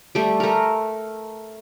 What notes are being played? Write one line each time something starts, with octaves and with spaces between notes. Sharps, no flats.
G3 A3
A3 A#4